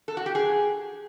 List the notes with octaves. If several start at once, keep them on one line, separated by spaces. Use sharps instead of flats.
A4
F#4
G4
G#4